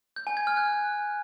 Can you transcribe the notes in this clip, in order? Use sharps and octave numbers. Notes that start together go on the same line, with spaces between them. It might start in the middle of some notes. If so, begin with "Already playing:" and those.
G6
G#5
G#6
F6
F#6